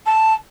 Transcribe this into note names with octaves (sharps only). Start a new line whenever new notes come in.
A5